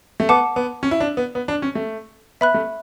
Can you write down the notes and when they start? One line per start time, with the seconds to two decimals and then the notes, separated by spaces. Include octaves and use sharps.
0.20 A3
0.29 B3 F#5 A5 D6
0.56 B3
0.83 C#4
0.91 E4
1.00 D4
1.17 B3
1.35 B3
1.48 D4
1.62 C#4
1.75 A3
2.41 B3 E5 B5 F#6
2.54 A3